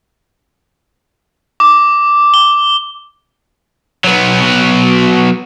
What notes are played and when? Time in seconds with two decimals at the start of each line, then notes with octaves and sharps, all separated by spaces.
1.60 D6
2.34 G7
4.04 F#3 B3